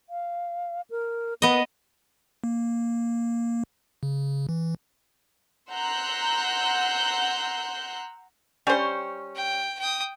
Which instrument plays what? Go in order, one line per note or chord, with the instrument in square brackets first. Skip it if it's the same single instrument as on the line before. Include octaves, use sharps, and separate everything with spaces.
[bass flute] F5
A#4
[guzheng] B3 D#5 [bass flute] B4
[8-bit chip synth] A#3
C#3
E3
[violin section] F#5 A#5 C6 E6 F#6 G6
[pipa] G3 C5 [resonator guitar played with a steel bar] C#4
[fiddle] G5
G5 D#6